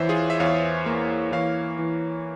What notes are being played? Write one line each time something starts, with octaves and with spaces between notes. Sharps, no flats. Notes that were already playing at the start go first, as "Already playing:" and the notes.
Already playing: E2 E3 C5 C#5 E5
F4 G#4
E5
E2 C#5 F5
A#3
E3 C#5 F5
E3